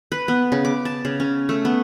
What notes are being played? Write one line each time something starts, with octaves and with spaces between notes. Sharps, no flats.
B4
B3
C#3
D6
A5
C#3
C#4
A3
B3